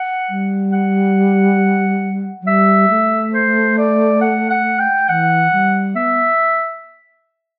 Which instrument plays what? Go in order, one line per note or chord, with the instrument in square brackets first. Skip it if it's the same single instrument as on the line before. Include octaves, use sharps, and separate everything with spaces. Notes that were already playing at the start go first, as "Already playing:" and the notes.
Already playing: [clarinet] F#5
[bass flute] G3
[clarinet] F#5
[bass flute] F#3
[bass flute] G3 [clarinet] E5
[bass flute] A3
[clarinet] C5
D5
F#5
F#5
G5
[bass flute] E3 [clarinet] F#5
[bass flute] G3
[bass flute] B3 [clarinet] E5